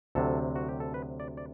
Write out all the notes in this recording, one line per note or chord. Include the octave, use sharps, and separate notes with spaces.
D2 C3 F#3 A4
F#4
G4
A4
B4
D5
D5